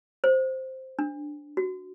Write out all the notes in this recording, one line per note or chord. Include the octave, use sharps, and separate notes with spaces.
C5
D4
F#4